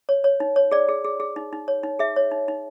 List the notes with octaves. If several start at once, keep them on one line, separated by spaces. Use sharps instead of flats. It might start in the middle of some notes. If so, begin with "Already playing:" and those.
C#5
C#5
D#4
C#5
G#4 D5
G#4
G#4
G#4
D#4
D#4
C#5
D#4
G#4 E5
C#5
D#4
D#4